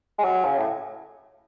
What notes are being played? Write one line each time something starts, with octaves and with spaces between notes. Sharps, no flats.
G#3
F#3
C#3
A2